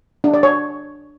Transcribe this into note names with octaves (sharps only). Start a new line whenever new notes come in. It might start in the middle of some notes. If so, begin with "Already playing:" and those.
D4
D5
C#5